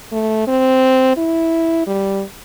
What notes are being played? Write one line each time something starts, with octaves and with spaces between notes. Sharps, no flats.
A3
C4
E4
G3